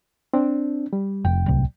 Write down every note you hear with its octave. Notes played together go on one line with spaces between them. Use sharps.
C4 D4
G3
F1 G5
D1 C2